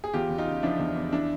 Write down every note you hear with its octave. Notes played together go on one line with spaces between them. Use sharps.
G#4
E2 F4 G4
E2
D#4 F4
C#3
F3 D4 E4
E2
E2
D4 E4